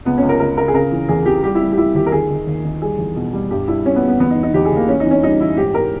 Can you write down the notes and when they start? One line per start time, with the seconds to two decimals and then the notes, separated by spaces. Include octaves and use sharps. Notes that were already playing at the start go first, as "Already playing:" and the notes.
0.05 C#2 B3
0.18 C#2 C#4
0.29 A#4
0.40 C#2 A#4
0.57 C#3 A#4
0.68 G#4
0.74 C#3 A#4
0.92 E3
1.08 E2 G#4
1.26 E3 G4
1.44 G3 G4
1.55 E4
1.61 G3
1.72 G4
1.78 G3 E4
1.95 D#2 G4
2.06 A#4
2.12 D#3 G#4
2.30 D#3
2.47 D#2
2.64 D#3
2.82 G3 G#4
2.98 E2
3.16 B2
3.33 G3
3.50 G2 G4
3.67 G2 E4
3.85 G3 C#4
3.96 B3
4.03 G3
4.08 B3
4.20 E2 B3
4.30 D#4
4.37 E2
4.43 D#4
4.54 E2 G4
4.65 G#4
4.72 E2 A#3
4.88 E3 C#4
5.00 D#4
5.06 E3
5.11 C#4
5.23 G3 D#4
5.40 E3 E4
5.57 G#2 G4
5.74 G#2 A#4